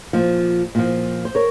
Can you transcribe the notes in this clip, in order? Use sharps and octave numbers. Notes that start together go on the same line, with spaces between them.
A#2 F3
A#2 F3
C5
A#4 C#5